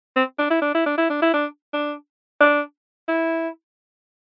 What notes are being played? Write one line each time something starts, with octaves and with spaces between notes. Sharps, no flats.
C4
D4
E4
D4
E4
D4
E4
D4
E4
D4
D4
D4
E4